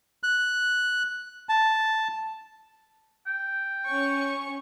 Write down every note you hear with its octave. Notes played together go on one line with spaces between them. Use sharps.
F#6
A5
G5
C#4 C#6